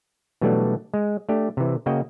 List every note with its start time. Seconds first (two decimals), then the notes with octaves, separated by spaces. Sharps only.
0.41 B2 E3 F#3 G3 A3 D4
0.94 G#3
1.29 A3 D4 G4
1.57 C3 E3
1.86 C#3 A#3 F#4 D#5 G5